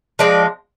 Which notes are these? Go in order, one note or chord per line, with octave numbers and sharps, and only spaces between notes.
F3 G#3 C4 D5